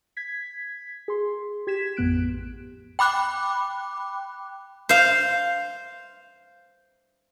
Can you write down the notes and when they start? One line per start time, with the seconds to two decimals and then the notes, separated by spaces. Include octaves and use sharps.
0.17 G#6 B6
1.08 G#4 C6
1.67 G4 G#6 B6 E7
1.97 A1 F2 A2 B3 F#6 D7
2.99 G5 B5 D6 F#6
4.89 C5 F5